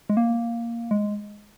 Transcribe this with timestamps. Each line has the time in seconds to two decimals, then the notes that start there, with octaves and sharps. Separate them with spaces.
0.10 G#3
0.17 A#3
0.91 G#3